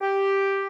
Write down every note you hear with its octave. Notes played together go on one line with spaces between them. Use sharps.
G4